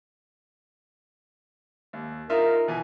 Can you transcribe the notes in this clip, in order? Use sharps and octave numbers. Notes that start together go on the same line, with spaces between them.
D#2
D#4 F4 A#4 E5
B2 E3 G#5